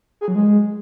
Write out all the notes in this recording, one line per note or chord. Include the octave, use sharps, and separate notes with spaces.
G#4
F#3
G#3